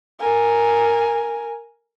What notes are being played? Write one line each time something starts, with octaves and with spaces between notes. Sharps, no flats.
A#4 G#5